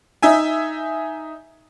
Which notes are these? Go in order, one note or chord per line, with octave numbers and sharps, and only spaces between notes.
D#4 E5 G#5